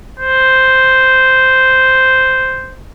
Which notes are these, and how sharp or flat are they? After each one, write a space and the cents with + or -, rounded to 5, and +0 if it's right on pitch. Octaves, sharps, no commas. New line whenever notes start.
C5 -5